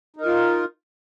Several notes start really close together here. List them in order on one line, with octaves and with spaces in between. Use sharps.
D#4 A#4 F4